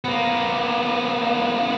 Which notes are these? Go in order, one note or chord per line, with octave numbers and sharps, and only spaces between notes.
A#3 B3